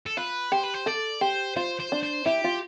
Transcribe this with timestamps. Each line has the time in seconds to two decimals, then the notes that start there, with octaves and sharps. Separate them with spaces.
0.06 A4
0.17 F4 B4
0.52 G4 C5
0.63 B4
0.74 C5
0.86 A4 D5
1.21 G4 C5
1.56 F4 C5
1.80 C5
1.92 D4
2.03 C5
2.26 E4 G4
2.44 F4